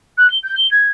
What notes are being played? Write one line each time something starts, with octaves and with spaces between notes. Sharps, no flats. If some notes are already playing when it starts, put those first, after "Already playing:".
F#6
G7
G6
G7
G#6